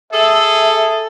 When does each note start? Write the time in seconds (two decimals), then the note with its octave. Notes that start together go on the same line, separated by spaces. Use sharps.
0.13 G#4 A4 E5